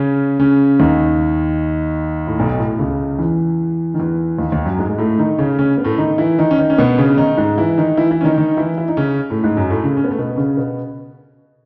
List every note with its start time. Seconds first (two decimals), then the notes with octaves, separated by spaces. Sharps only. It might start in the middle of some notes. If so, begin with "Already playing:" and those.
Already playing: C#3 C#4
0.39 C#3 C#4
0.80 D#2 D#3
2.27 A2
2.39 B1 B2
2.59 A2
2.79 C#2 C#3
3.18 E2 E3
3.94 D#3
3.99 E2 E3
4.38 D#2 D#3
4.52 D#2 D#3
4.65 F#2 F#3
4.79 G#2 G#3
4.89 G#3
4.98 A2 A3
5.18 D#3 D#4
5.39 C#3 C#4
5.59 C#3 C#4
5.77 B3
5.84 A2 A3
5.98 D#3 D#4
6.18 E3 E4
6.38 D#3 D#4
6.51 C#4
6.58 D#3 D#4
6.70 C#4
6.78 B2 B3
6.98 C#3 C#4
7.09 C#4
7.17 D#3 D#4
7.37 G#2 G#3
7.58 E3 E4
7.78 D#3 D#4
7.97 E3 E4
8.11 E3 E4
8.21 C#4
8.24 D#3 D#4
8.38 D#3 D#4
8.57 E3 E4
8.78 E4
8.88 D#4
8.97 C#3 C#4
9.30 A2 A3
9.44 G#2 G#3
9.57 F#2 F#3
9.70 A2 A3
9.83 C#3 C#4
9.97 C#4
10.04 B3
10.11 A3
10.19 B2 B3
10.36 C#3 C#4
10.57 B2 B3